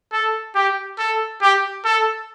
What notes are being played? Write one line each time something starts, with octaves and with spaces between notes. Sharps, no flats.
A4
G4
A4
G4
A4